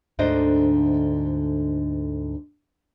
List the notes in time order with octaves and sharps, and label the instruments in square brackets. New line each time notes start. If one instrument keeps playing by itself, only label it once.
[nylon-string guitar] D2 G#2 D3 D4 C5 D#5